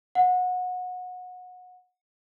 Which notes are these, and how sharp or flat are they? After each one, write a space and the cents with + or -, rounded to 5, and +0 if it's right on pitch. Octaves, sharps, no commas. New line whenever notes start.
F#5 -25